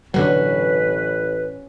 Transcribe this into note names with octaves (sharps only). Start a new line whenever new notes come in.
A1 B2 D3 F#3 C#4 F#4 B4